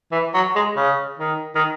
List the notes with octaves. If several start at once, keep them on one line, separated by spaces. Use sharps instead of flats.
E3
F#3
G#3
C#3
D#3
D#3